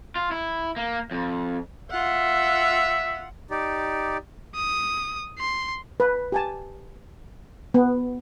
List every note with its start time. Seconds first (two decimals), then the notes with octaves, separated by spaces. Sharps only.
0.16 F4
0.31 E4
0.77 A#3
1.11 F2
1.91 F4 E5 F#5
3.50 D#4 G4 D5
4.56 D#6
5.39 C6
6.00 B4
6.32 G4 G#5 A5
7.74 B3